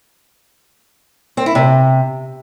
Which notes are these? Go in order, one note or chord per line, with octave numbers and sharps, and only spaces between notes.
C4
E4
C3